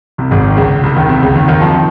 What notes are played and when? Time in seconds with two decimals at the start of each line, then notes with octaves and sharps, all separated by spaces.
0.18 C2 C3
0.31 G#1 G#2
0.46 D#3
0.57 C#2 C#3
0.83 C2 C3
0.96 D#2 D#3
1.09 C2 C3
1.22 C#2 C#3
1.35 D#2 D#3
1.48 D#2 D#3
1.61 F2 F3
1.74 D#3